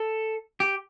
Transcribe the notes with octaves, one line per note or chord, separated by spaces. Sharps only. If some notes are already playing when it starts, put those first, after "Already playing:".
Already playing: A4
G4